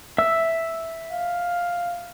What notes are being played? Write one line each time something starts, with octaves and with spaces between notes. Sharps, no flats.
E5 E6
F5